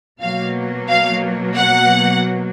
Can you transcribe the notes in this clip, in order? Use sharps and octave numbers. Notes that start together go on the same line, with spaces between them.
B2 F#3 A#3 F5
F5
F#5